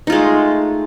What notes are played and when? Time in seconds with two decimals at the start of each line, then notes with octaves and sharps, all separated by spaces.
0.07 D#4
0.10 F4
0.12 G#3
0.15 A3